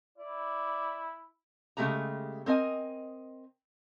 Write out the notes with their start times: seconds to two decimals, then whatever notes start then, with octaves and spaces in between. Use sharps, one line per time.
0.18 E4 D5
1.77 C#3 G#3 A3 G4 A#5
2.46 C4 A#4 D#5 G#5